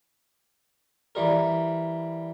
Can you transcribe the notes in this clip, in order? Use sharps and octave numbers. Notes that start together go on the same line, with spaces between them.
E3 G3 A#4